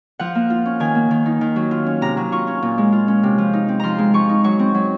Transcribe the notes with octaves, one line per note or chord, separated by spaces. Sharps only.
F3 F#5
A#3
F4
C#4
D#3 G#5
A#3
D#3
D#4
D#3
F#3
F4
C#4
C3 A#5
F#3
F4 C#6
C#4
A#2
G#3
F4
C#4
C3
F3
D#4
C4
F3 A#5 C6
G#3
F3 C#6
D#4
F#3 C#6
C4
F#3